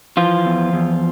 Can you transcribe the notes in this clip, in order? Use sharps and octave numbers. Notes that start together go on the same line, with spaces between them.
E3 F3 F4
E2
E2